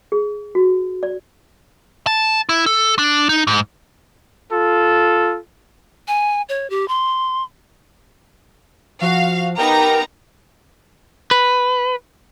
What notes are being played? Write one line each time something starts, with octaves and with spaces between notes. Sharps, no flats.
G#4
F#4
D5
A5
E4
A4
D4
D#4
G#2
F4 A4
G#5
C#5
G4
C6
F3 F#4 F5
B3 D#4 G4 A#4 G5 A#5
B4